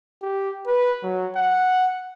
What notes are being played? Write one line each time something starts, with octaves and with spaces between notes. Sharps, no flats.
G4
B4
F#3
F#5